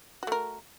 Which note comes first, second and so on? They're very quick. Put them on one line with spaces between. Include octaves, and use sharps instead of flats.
F#4 A3 A#4